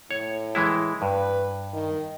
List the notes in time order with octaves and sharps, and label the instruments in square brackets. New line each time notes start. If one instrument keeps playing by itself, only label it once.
[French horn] A2 [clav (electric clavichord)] C#5
[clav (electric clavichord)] E3 G#3 E4
[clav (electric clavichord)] G2 [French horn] B4
[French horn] D#3